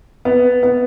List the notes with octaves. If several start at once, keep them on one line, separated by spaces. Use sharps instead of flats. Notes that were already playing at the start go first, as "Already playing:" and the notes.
B3
B3